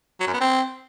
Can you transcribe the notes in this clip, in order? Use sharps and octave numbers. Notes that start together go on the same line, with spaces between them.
F#3
F#2
B3
C4